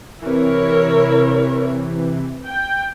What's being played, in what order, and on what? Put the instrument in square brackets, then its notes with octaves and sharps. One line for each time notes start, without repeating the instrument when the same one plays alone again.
[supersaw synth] C3 E3 [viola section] E4 A#4 C#5
[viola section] G5